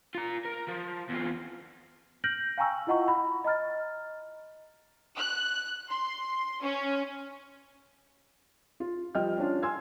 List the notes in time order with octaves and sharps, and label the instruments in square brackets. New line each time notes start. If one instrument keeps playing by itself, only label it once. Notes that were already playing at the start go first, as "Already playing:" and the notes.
[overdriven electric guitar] F4 A#5
A#4
F3
E2 F4
[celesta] F6 G6 A#6 D7 F#7
F5 G5 G#5 A#5 C#6 E6
E4 F4 D#5 F#5 A#5 C#6
B5
D#5 A#5 F6 A6
[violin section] F#6
C6
C#4
[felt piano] F4
F3 G3 D#5 G5 F6
C#4 D4 F4
G#5 C6 E6 G#6